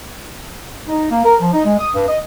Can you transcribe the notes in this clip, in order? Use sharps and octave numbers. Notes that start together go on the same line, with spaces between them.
D#4
A#3
A#4
F3
D#4
G#3
D#6
G2
D#5